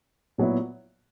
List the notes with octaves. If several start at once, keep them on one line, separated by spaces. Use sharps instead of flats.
A#2 F#3 B3 E4